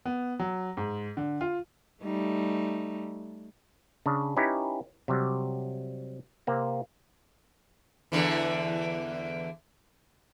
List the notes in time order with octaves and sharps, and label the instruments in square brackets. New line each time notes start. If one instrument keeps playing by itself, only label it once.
[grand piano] B3
F#3
G#2
D3
F4
[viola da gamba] G3 A3 D#4
[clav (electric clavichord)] C#3 D4
C#4 D#4 E4 G4 B4
C3 F#3 G3
C3 A#3 C4
[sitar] E2 D3 E3